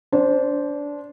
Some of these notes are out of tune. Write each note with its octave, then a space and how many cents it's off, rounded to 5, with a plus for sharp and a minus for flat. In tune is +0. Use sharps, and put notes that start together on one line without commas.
D4 -20 C5 +0